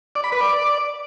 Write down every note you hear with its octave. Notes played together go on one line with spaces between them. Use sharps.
D5
B5
B4
D5